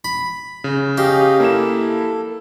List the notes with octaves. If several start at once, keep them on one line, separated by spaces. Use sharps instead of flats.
B5
C#3
C#4 G4 D#5 F5
A#3 E4 A4 E7